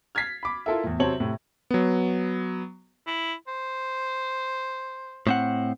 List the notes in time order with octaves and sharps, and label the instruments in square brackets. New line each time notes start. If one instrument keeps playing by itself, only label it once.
[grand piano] F6 G#6 A6 B6 C7
B5 D6
E4 F4 A4 A#4 E5
E2 A2
C3 F#3 C4 C#5 A5 F#7
A2 C3
[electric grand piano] F#3 B3
[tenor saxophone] E4
C5
[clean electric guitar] A2 C4 F#5